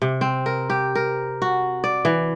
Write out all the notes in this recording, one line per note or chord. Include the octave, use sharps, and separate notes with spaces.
C3
C4
A#4
G4
A#4
F#4
D5
E3